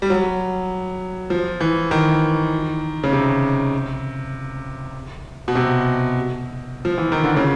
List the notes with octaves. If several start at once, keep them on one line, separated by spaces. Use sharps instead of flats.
G3
F#3
F3
E3
D#3
C#3
C3
B2
C3
F3
E3
D#3
D3
C#3